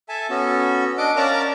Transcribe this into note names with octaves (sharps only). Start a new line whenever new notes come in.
A4 E5 G#5 A5
B3 C#4 F#4 A4
D4 D#5 F#5 D6
C#4 A#4 D5 F5 A5 A#5